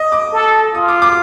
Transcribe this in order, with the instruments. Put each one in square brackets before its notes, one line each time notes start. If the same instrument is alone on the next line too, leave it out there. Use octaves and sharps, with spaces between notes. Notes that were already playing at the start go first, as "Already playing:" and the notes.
Already playing: [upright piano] D#5
D6
[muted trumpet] A4
[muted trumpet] F4 [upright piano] D#6
[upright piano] D6
D6